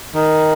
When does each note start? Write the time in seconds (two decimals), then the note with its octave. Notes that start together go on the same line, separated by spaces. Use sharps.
0.15 D#3